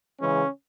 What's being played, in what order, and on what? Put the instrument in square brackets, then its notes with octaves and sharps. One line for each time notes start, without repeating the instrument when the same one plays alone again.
[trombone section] C#3 E3 G#3 C#4